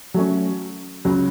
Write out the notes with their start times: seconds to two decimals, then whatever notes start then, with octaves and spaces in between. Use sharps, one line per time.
0.14 F#3 A3 C#4
1.05 C#2 C#3 F#3